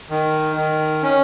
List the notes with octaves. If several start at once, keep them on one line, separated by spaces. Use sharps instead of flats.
D#3
D#3
C#4